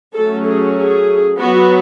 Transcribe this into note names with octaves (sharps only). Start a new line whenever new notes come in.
F#3 A3 C#4 A4
G#4
G#4
F#3 B3 F#4